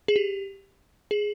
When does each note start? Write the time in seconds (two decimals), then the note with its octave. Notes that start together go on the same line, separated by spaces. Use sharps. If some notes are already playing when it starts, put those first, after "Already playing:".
0.08 G#4
0.16 G4
1.11 G#4